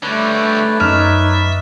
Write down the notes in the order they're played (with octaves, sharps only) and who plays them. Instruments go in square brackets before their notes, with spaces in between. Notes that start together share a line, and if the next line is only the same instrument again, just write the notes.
[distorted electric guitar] D3 G3 [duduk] A3 [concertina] B4 C#5 D5
[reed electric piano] F#2 F6 [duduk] D#4 [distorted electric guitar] E5